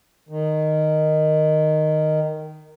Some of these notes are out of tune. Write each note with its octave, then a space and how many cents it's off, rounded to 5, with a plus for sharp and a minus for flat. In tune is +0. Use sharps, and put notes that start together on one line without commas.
D#3 -10